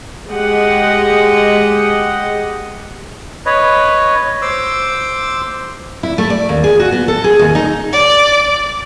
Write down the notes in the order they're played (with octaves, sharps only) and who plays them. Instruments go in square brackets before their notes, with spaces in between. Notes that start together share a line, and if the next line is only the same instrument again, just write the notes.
[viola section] G#3 G4 D#5 F#5
[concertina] B4 C#5 D#5
C5 C6 D6 E6
[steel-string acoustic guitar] E4
A3
D5
D#2
G#4
F#4
B3
A4
G#4
D#2
D#4
[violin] D5